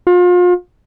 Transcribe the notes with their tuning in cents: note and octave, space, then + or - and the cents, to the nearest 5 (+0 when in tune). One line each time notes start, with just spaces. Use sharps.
F4 +35